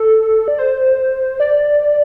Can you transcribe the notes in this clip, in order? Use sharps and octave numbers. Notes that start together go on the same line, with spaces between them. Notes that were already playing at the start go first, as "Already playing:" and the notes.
Already playing: A4
D5
C5
D5